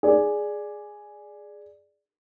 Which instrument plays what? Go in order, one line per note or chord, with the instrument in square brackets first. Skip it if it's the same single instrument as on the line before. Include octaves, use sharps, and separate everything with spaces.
[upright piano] G#4 D5